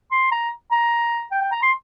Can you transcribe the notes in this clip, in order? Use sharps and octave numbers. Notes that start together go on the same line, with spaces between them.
C6
A#5
A#5
G5
G5
A#5
C6